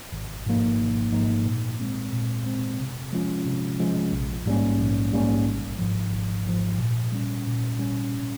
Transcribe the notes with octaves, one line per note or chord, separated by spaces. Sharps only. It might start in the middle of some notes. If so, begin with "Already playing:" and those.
G#1
G#2 F3 A#3 D#4
G#1
G#2 F3 A#3 D#4
A#2
G#3 C4
A#2
G#3 C4
C3
F3 G#3 C#4 F4
C3
F3 G#3 C#4 F4
A#1
G#2 G3 A#3 C#4
A#1
G#2 G3 A#3 C#4
G#1
G#2 F3
G#1
G#2 F3
A#2
G3 C#4
A#2
G3 C#4